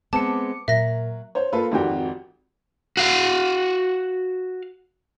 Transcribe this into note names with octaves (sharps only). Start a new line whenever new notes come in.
G#3 B3 C4 A5 D6 C#7
A#2 F#3 A#4 E5 A#6
C5 C#5
A#3 F4 A4 B4
G#1 F2 D#3 F#4 G4 G5
F#4 F5